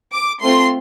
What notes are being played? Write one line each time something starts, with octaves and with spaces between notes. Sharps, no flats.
D6
A3 C4 F4 C6